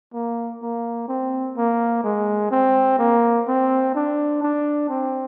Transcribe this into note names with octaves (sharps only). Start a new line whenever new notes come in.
A#3
A#3
C4
A#3
G#3
C4
A#3
C4
D4
D4
C4